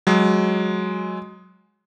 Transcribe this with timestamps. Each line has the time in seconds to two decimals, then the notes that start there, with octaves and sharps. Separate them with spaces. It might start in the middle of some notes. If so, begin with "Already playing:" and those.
0.07 F#3 G#3